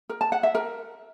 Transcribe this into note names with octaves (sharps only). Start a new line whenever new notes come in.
A#4
A5
F#5
E5
A#4